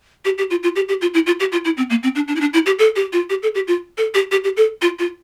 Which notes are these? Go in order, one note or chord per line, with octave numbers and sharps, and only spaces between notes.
G4
G4
F4
F4
G4
G4
F4
E4
F4
G4
F4
E4
C4
A#3
C4
D4
D4
E4
D4
E4
G4
A4
G4
F4
G4
A4
G4
F4
A4
G4
G4
G4
A4
F4
F4